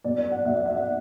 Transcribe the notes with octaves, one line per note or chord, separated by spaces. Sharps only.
B2 F#3 D5
D5
F#5
B2 F#3 E5
D5
E5
F#5